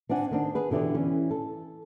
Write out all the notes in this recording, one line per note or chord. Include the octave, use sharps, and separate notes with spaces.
C4 D4 D5 F#5 G#5
D#3 C4 D4
G#4 B4
B2 D3 E3 G4 D5
E3 C#4
A4